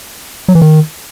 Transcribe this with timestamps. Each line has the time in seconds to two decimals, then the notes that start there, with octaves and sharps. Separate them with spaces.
0.48 F#3
0.55 E3
0.62 D#3